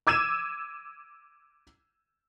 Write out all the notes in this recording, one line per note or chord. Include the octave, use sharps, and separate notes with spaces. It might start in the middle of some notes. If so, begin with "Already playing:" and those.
D6 E6 G#6 D#7 E7